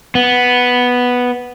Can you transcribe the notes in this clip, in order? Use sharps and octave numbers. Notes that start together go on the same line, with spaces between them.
B3